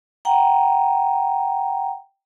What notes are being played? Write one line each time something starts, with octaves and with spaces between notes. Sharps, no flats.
F#5 G5 A#5